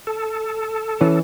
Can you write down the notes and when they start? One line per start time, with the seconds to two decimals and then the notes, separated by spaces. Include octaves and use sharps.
0.07 A4
1.01 E3 C#4